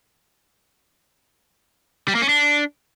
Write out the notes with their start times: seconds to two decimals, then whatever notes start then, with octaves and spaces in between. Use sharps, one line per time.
2.08 G3
2.15 A#3
2.22 C#4
2.29 D4